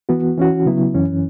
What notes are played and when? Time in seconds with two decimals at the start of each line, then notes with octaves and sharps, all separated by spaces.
0.09 E3 B3 F#4
0.37 E3 C#4 F#4
0.66 C#3 F#3 B3 E4
0.94 F#2 E3 C#4